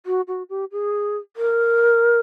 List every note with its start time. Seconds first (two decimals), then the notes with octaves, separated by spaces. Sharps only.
0.06 F#4
0.28 F#4
0.49 G4
0.72 G#4
1.37 A#4